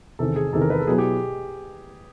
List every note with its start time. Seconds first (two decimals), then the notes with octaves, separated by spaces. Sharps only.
0.19 E2 C3 D#3 A4
0.36 G#4
0.53 E2 C3 D#3 A4
0.61 A#4
0.70 B4
0.79 A4
0.87 B2 F#3 B3 E4 G#4
0.98 G4